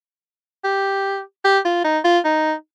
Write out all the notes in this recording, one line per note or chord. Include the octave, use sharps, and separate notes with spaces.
G4
G4
F4
D#4
F4
D#4